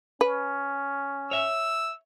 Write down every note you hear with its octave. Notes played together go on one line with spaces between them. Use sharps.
C#4 B4
C#5 E5 E6